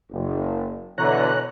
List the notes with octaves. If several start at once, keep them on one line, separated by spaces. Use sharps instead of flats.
F#1
B2 D3 E3 C#5 A#5 F#6